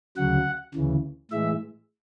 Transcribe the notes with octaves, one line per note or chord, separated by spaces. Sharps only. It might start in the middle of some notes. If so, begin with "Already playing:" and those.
D2 C#3 F#3 F#5
D2 C#3 E3
A2 E3 G#3 E5